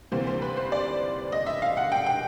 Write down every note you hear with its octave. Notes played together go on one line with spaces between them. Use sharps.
D2 C3 E3 G3 A#3 C5
C5
B4
C5
D5
D#5
E5
F5
F#5
G5
G5